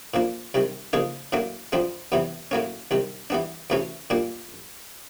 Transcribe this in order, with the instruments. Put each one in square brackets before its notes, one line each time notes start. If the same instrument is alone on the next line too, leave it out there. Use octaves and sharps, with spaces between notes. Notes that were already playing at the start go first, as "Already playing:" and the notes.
[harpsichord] A#2 F3 A#3 D4
C2 C3 D#3
C#3 F3 A#3 D#4 G#4
A2 F#3 A#3 D4
F2 D3 F3 G#3 C4
E2 C3 E3 G3 B3
A2 F#3 A#3 C#4
C2 C3 D#3
E3 G3 B3 D4
D2 C3 E3 A3 C#4
A#2 G3 A#3 D4